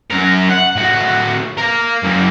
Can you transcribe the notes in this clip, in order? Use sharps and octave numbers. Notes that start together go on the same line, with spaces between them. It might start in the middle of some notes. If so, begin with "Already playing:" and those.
F#2 A#4
F#5
A2 F#4
A#4 F5
F#2 A#3